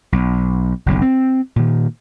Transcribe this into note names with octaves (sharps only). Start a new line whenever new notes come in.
B1
F#1 B1 D3
C4
A#2 D#3